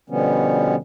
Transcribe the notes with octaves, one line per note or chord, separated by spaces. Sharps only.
B2 D3 F3 G3 B3 C#4